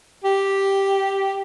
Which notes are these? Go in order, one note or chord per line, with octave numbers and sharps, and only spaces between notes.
G4